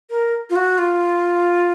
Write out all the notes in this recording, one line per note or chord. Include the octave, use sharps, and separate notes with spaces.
A#4
F4
F#4
F4